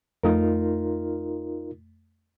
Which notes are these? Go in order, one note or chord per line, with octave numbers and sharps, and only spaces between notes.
F2 A3 D#4 F4 A#4